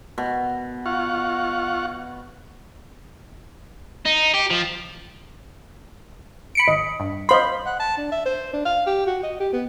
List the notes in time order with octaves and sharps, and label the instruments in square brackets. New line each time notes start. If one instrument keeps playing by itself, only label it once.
[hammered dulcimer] B2
[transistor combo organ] F4 F#5 C#6
[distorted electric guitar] D#4
G4
F3
[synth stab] B5 C#7 D7
[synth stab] G#1 [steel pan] D#5
[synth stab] G2
[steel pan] C5 C6 [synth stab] D#5 F5 B5
[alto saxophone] F#5
A5
D4
E5
C5
D4
F5
G4
F#4
D#5
G4
B3